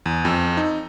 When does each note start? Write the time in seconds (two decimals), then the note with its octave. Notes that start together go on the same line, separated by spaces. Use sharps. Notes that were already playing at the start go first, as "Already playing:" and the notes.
0.06 E2
0.25 F2
0.57 D#4